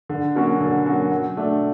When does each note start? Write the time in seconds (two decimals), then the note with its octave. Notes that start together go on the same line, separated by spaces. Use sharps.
0.10 D3
0.35 F#3 A#3 C#4 F#4
0.61 D3
0.86 F#3 A#3 C#4 F#4
1.12 F#3
1.37 A3 D4